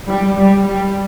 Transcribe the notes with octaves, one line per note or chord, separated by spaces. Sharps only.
G3
G3
G3